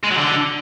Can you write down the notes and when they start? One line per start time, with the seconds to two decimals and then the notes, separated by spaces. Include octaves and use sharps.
0.04 G#3
0.11 F#3
0.18 D3